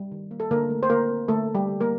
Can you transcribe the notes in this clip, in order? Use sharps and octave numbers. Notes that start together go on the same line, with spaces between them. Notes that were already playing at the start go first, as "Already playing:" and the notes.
Already playing: G3
D#3
A#3
A4
D3 A#3 A#4
A3
C5
D3 A#3 A#4
C4
D3 A3 A4
A3
G3 G4
D3
A#3 A#4